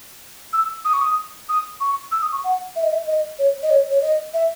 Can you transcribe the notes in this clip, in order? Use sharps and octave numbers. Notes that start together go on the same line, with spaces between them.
E6
D#6
C#6
D#6
D#6
C#6
E6
D#6
C#6
F#5
E5
D#5
E5
D#5
C#5
D#5
C#5
C#5
D#5
E5